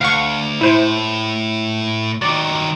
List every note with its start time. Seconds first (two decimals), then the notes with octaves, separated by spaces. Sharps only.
0.01 D2 F5 F#5 C#6
0.61 A2 E4 C5
2.22 D#3 F#3 D5